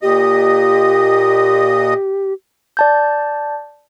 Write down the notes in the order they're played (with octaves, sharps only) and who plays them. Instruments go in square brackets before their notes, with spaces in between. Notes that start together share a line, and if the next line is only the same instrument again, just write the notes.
[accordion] A#2 D#5 [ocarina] G4
[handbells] D5 A5 G6